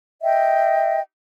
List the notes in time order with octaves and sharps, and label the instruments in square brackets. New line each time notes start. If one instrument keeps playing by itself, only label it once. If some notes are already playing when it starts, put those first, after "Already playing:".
[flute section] D#5 E5 G5